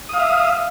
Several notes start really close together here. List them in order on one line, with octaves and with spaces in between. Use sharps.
D#6 F5 E5